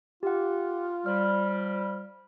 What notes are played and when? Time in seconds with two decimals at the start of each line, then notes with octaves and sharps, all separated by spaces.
0.23 F4 G4 F#5
1.06 F3 G3 F6